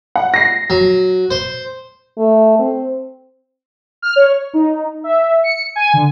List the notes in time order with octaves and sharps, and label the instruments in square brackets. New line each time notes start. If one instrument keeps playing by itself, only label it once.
[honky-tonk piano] F#5
A#6 C7
[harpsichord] F#3
C5
[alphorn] A3
C4
[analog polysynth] F6
C#5
D#4
E5
C#7
G#5
D3